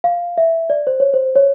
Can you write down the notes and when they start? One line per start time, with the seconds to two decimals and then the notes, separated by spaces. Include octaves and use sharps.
0.04 F5
0.38 E5
0.70 D5
0.87 C5
1.00 C#5
1.14 C5
1.36 C#5